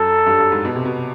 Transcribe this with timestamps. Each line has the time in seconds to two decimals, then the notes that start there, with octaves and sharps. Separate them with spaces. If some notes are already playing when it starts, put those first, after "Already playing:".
Already playing: F#2 A4
0.26 G2
0.39 G2
0.52 G#2
0.65 B2
0.75 C3
0.85 B2